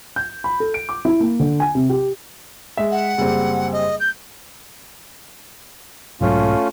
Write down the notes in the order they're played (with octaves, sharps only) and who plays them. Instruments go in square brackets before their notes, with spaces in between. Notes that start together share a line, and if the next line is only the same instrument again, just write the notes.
[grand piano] G6
B5
A4
D7
D6
E4
A#3
D3
G#5
C3
G4
G#3 E5
[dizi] F#5
[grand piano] F#1 G3 C4
[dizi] D#5
G6
[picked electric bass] B1 G#2 F#3 [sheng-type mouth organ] A3 C#4 F4